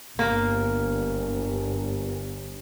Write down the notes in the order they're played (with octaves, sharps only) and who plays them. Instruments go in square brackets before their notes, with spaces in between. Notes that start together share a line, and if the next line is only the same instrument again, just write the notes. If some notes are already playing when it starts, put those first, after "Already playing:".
[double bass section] G1 [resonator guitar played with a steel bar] A#3